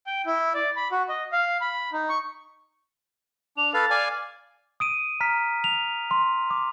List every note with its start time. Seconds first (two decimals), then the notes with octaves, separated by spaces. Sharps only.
0.07 G5
0.26 E4
0.54 D5
0.76 B5
0.92 F#4
1.09 D#5
1.32 F5
1.61 B5
1.93 D#4
2.09 C#6
3.57 D4 F7
3.74 A4 B4 F5 A6
3.90 D5 F5 G#5
4.80 D#6 D7 D#7
5.20 A#5 F6 B6
5.64 F7
6.11 C6
6.50 D6